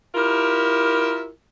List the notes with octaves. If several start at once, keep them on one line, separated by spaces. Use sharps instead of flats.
E4 F4 G4 A#4